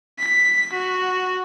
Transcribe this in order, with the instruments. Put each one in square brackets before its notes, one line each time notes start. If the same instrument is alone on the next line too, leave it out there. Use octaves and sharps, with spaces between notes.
[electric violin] B6
F#4